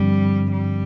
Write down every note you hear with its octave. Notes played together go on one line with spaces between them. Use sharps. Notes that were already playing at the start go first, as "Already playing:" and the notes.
Already playing: G2 D3 F3 G3 C4
G3